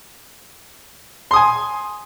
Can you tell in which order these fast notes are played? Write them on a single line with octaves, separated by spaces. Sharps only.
C6 D#6 G#5